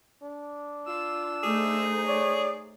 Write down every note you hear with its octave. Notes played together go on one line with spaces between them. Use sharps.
D4
F4 E6
A3 D#4 G#4 C5
C#5 D5